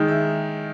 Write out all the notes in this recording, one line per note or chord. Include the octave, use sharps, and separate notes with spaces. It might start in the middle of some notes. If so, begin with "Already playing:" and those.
Already playing: D#3 G#3 D#4
E5